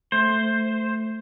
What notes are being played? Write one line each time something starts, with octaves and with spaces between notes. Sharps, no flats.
A3 C5